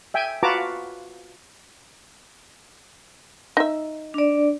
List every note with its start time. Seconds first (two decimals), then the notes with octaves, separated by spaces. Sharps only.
0.14 E5 G5 G#5
0.43 F4 F#4 B4 A5 A#5 D6
3.57 D#4 E5
4.14 D4 D5